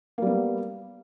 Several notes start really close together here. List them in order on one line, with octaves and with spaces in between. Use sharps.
A#3 G3 B3